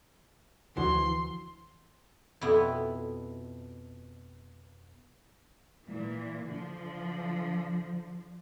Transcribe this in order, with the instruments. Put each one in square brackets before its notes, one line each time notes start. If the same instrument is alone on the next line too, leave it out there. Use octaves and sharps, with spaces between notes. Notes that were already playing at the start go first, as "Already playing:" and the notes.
[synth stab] D2 F3 F#4 [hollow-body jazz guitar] E3 [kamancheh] C6
[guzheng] F2 B2 B3 E4
[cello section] A#2 E3
D3 F3